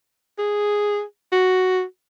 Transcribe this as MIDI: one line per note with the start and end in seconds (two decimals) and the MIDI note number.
0.39 1.02 68
1.32 1.83 66